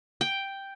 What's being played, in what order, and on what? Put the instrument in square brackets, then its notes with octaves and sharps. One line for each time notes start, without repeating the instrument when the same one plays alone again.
[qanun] G5